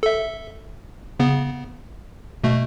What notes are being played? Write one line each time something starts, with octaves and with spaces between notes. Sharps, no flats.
A4 E5
C#3 B3
B2 A3